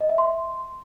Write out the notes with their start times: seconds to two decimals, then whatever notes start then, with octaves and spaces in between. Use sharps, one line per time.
0.01 D#5
0.09 E5
0.18 C6